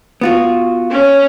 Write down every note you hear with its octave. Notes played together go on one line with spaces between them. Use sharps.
B3 F4 F#4
C#4